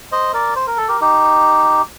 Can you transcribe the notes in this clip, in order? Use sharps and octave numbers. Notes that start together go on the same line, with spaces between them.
C5 D#5
A#4 D5
C5
A#4
A4
G4 A#4
D#4 G4